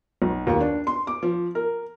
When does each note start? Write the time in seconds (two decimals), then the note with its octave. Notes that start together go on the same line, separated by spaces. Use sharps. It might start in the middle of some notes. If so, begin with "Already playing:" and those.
0.22 B1
0.47 D#2
0.61 D4
0.87 C6
1.07 D6
1.23 F3
1.55 A#4